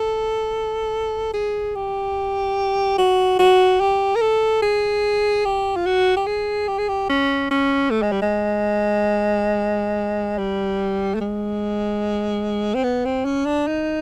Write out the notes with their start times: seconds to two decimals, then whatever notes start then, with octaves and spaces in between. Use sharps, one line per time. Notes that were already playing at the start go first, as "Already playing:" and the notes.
Already playing: A4
1.34 G#4
1.75 G4
2.98 F#4
3.39 F#4
3.81 G4
4.16 A#4
4.21 A4
4.62 G#4
5.45 G4
5.76 F4
5.86 F#4
6.17 G4
6.27 G#4
6.68 G4
6.78 G#4
6.89 G4
7.10 C#4
7.51 C#4
7.91 A3
8.02 G#3
8.12 G3
8.22 G#3
10.38 G3
11.15 A3
11.21 G#3
12.75 C4
12.84 B3
13.05 C4
13.25 C#4
13.46 D4
13.67 D#4